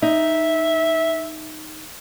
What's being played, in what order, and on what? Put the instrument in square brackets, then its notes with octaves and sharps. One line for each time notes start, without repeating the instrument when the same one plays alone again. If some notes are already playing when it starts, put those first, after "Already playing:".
[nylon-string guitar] D#4 [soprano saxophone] E5